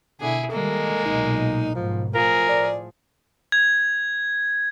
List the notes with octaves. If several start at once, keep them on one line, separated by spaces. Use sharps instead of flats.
B2 D3 E4 G#4
D#3 G3 G#3 A#3 A4
B1 A#2 D#4
G#2 B2 F3
A2 F3 F4 G#4 A#4
D5
G#6